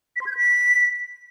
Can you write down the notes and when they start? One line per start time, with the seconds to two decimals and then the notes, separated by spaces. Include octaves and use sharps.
0.16 B6
0.21 C6
0.26 G#6
0.32 G6
0.37 B6